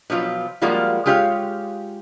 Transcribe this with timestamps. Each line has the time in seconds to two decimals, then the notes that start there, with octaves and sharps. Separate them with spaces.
0.10 B2 F3 F#3 F4
0.62 F3 G3 G#3 A#3 F4 F#4
1.06 G#3 F4 G4 C#5 F5